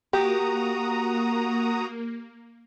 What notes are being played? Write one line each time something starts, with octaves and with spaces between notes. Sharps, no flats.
A#3 F#4 G4 A#5 D#6